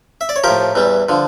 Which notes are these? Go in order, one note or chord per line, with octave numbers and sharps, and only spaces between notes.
E5
D5
C#5
A2 F3 G4 A#4
E2 E3 G3
D3 F3